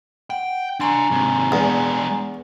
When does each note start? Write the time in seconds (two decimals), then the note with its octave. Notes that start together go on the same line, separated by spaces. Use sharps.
0.30 F#5 G5
0.80 D4 G#5 A#5 C6 C#6
1.11 G#2 C3
1.52 E2 G#3 D4